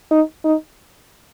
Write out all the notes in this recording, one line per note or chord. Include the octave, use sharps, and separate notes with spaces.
D#4
D#4